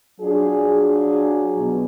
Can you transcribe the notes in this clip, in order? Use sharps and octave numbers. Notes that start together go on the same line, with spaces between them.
F#3 D4 F4 G#4
B2